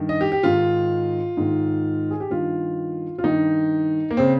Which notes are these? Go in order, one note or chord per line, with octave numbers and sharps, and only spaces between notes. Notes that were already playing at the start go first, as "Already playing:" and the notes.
Already playing: G2 D#3
D#5
G4
G4
G#2 D#3 F4
G#2 D#3
G#4
G4
G2 D#3 F4
F4
G2 D#3 D#4
A#3
C#3 C4